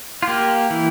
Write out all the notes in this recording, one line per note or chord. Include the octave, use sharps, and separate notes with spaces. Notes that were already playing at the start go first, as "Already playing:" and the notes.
F4
A#3 G4
E3